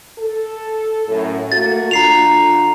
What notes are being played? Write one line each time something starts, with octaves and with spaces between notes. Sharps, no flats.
A4
F#2 A2
A3 A#3 F#4 A6
D3 F4 A#5 C7 F7